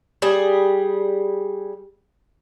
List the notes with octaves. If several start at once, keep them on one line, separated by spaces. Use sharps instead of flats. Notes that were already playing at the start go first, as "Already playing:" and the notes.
G3 G#4